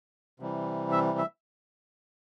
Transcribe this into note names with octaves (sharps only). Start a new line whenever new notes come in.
C3 E3 G3
E5
E5